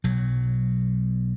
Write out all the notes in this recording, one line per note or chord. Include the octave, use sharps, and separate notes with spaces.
B1 F#3